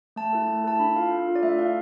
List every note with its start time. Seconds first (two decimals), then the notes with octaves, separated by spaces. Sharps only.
0.16 A3 A5
0.33 E4 A4
0.48 A3
0.64 E4 A4 A5
0.79 D4 B5
0.96 F4 A4 F5
1.11 D4
1.27 F4 A4
1.36 D5
1.43 A3 E5
1.59 E4 A4 F5